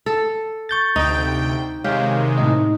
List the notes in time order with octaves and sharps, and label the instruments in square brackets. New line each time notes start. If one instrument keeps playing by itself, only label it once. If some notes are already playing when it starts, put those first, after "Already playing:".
[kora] A4
[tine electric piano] C#6 G6 A6
[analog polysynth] D2 C3 G5 [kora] D#4
[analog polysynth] C3 D#3 G#3 [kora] G4 [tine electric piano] C#5 F5
[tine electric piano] A2 D#4 D#5